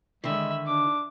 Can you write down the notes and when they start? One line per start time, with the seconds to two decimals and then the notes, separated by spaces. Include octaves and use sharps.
0.24 D3 D#3 G#3 E5 B5
0.66 D4 D6